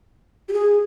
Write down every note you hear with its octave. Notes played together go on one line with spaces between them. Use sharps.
G4
G#4